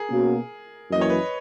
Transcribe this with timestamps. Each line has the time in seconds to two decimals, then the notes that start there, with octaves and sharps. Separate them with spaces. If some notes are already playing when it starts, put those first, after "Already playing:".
Already playing: G#4 A#4
0.10 B2 A#3 C#4 F#4
0.89 F#2 E3 A#3 D#5
1.01 C#5
1.10 B4